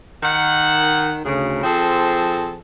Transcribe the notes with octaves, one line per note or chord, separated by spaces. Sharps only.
D#3 F#5
D2 C#3
F3 C4 G#4 A4